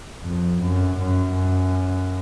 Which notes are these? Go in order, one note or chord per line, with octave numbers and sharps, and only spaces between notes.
F2
F#2
F#2